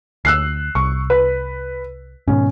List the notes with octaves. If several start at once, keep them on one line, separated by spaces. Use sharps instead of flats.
D2 E6 F#6 C7
C2 C#6
B4
G#2 B2 D#3 C#4